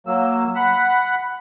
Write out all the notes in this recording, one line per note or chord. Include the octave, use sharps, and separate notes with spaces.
F#3 A#3 E6
F#5 B5